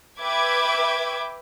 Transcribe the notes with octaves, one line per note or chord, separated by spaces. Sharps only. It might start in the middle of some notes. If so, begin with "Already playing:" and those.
B4 E5 G5 B5 D6 G#6